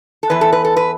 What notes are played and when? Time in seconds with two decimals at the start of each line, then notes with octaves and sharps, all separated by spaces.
0.23 A4
0.30 E2 E3 B4
0.41 A4
0.53 B4
0.64 A4
0.76 B4